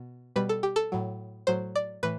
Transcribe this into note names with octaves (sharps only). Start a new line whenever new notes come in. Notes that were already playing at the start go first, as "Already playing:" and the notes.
Already playing: B2
B2 G3 B4
A4
G4
A4
A2 F#3
A2 F#3 C5
D5
A2 E3 B4